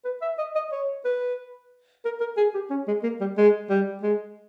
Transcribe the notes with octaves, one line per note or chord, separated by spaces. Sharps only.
B4
E5
D#5
D#5
C#5
B4
A#4
A#4
G#4
G4
C#4
G#3
A#3
G3
G#3
G3
G#3